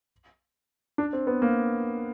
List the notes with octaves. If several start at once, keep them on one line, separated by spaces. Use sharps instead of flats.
D4
C4
B3
A#3